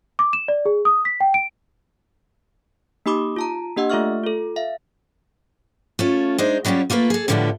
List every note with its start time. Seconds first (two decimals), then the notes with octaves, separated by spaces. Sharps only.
0.19 D6
0.33 E7
0.48 D5
0.65 G#4
0.85 D#6
1.05 B6
1.20 G5
1.34 D7
3.06 A#3 D#4 G4 B5 D6 D#6
3.36 F4 A5 A#5
3.77 A#3 D4 G4 D#5 F#5 E6
3.90 A3 F4 A4 E5 C#6 F6
4.24 F4 A4
4.56 E5 F5
5.99 A3 C#4 F4
6.38 G#3 D4 D#4 C5
6.65 F#3 G3 C#4 F4 G4
6.90 A3 A#3 E4 F4 B4
7.10 G#4 A4
7.28 A2 D3 F3 G3 B3 E4